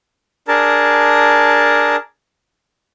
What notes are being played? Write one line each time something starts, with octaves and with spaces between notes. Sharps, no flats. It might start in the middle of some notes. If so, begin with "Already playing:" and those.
D4 G#4 A#4 A5